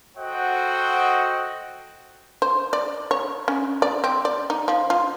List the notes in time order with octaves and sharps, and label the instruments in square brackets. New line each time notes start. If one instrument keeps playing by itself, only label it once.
[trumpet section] F#4 A4 C5 D#5 F#5 G5
[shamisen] C5
D5
C#5
C#4
D5
C4
D5
D#4
F3
F4